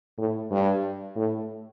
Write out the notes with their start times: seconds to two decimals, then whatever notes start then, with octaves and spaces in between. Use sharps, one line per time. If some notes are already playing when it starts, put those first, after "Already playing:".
0.18 A2
0.51 G2
1.16 A2